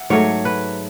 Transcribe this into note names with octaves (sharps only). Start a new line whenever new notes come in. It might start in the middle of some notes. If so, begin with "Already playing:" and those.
Already playing: E5 F#5
G#2 F#3 A3 C#5
B4